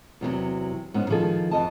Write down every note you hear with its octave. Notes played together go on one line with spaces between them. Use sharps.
E2 C3 D#3 F#3
G#2 B3 C#4
D#3 F3 G#4 A4
F2 D#5 A5